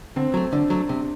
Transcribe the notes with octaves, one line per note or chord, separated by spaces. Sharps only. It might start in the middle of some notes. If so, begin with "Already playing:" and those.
D3 C4
F#3 A3
D3 D4
F#3 A3
C3